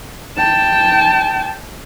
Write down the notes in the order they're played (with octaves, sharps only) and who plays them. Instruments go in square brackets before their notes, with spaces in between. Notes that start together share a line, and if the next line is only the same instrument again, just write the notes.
[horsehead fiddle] G5 A5